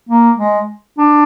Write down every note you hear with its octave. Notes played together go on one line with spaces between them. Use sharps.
A#3
G#3
D4